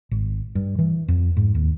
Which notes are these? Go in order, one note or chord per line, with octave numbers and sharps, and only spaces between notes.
G#1
G2
E3
F2
G#2
D#2